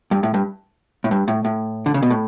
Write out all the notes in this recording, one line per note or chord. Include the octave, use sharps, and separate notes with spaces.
G2
A2
G2
A2
G2
A2
A2
D3
C#3
B2
A2